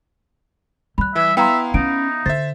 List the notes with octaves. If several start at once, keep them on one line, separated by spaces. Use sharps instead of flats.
G3 B5 F#6
E3 E4 E5
B3 E4 E5 F5 G5 A#5 C6
C#4 D#4 D7
D3 C5 E5 A6